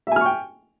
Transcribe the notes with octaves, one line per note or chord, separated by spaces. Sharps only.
E5 G5 G#5 C#6 F6